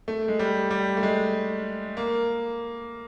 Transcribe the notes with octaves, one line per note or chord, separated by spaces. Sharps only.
A3
G#3
G3
G3
A3
G#3
A#3